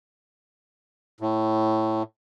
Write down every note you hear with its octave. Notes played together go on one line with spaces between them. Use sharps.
A2